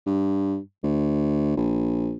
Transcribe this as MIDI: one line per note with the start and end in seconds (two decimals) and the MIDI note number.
0.06 0.58 43
0.84 1.53 38
1.57 2.16 34